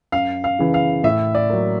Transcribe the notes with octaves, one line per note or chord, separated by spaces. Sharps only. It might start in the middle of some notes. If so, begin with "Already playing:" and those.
F#2 F5
F5
C#3 E3
F5
A2 E5
D5
F#3 A#3